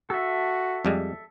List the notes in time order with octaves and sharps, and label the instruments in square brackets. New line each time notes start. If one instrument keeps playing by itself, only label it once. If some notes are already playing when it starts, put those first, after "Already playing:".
[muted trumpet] F#4 [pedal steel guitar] A4 E5
[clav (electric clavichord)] F2 G3 G#3